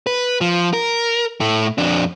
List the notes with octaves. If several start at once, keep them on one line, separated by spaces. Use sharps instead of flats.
B4
F3
A#4
A2 A3
F2 D4